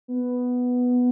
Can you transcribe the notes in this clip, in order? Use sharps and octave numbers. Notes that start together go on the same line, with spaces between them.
B3